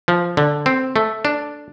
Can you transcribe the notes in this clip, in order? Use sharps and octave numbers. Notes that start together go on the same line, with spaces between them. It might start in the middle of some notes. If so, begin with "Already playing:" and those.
F3
D3
C4
A3
D4